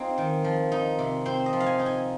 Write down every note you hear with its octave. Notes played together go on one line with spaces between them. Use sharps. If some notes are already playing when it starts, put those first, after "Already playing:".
Already playing: C4 D#4 F4 G#4
D#3
F3
D#4
C3
C4 C5
D#5
F3
F5
G#5
D#4
G#5